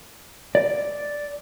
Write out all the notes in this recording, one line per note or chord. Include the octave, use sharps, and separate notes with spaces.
D5